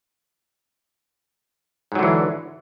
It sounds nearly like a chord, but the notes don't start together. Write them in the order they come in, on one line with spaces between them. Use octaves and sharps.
G#2 F#3 D3 E3